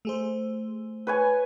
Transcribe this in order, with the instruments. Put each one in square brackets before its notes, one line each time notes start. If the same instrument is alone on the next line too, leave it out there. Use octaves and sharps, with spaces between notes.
[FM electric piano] A3 G#4 C5
[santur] B4 C#5 G#5